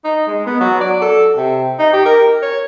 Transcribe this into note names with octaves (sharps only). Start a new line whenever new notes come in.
D#4
G#3
B3
F#3
D5
A4
C3
D#4
G4
A#4
C#5